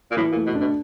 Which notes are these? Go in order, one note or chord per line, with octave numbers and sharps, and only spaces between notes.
A#2
A2 E3
A#2
A3
B2
D4
B2